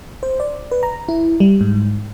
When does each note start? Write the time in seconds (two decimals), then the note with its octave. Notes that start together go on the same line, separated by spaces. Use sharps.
0.23 C5
0.40 D5
0.71 B4
0.83 A#5
1.09 E4
1.40 G3
1.61 G#2